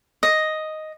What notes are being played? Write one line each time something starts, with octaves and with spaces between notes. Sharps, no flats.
D#5